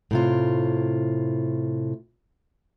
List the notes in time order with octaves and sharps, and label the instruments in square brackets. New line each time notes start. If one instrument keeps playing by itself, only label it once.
[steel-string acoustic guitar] A2 C3 F4